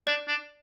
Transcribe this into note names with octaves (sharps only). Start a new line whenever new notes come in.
D4 D5
D4